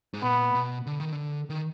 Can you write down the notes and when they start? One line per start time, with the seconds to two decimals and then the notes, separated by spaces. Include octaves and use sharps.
0.13 G#2
0.23 A#2 B3
0.55 B2
0.87 D3
1.00 D#3
1.12 D3
1.50 D#3